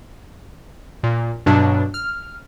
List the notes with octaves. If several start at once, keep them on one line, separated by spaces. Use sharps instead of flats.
A#2
G2 B2 F#3 D4
F6